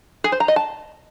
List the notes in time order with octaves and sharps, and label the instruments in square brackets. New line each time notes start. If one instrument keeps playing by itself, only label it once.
[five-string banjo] G#4
C5
A#5
D#5
A5